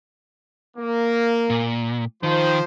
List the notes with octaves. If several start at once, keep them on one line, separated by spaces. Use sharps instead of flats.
A#3
A#2
D#3 F3 C5